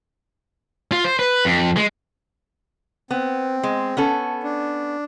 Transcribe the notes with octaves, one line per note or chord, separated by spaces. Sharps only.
F4
C5
B4
F2
G#3
B3 C4
G#3
B3 C#4 A4
D4